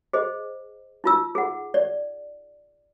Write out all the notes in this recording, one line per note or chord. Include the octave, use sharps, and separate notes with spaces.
G#4 C5 D#5
D#4 F4 E6
G#4 F#5
D5